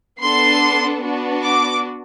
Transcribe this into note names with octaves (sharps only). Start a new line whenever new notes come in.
B3 D4 A4 C6
B3 D4 F#4
D6